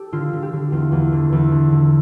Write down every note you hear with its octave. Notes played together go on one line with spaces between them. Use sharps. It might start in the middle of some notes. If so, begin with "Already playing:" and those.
Already playing: G4 A4
D3 F4
D3
G4
D3
E2 F4
E2
D3
E2
D3
D3